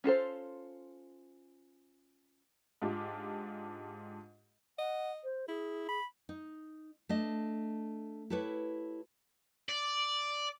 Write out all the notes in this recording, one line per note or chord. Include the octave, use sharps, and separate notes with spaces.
C#4 F4 A4 C5
G#2 D4 F4 G4
D#5 F#5
C5
E4 G#4
B5
D#4
A3 D4 D#5
E4 G4 A4 B4 C#5
D5